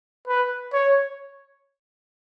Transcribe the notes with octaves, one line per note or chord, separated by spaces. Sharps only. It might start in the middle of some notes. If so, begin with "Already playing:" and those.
B4
C#5